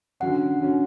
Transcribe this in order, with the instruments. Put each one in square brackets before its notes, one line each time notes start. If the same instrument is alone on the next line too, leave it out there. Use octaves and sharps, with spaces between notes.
[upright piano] D3 F#3 C#4 [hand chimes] F#5
[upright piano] D3 F#3 C#4